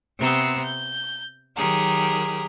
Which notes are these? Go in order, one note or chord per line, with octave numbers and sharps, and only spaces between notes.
C3 B3 C4 A#5 E6
G6
D#3 F#3 G4 G#4 A#4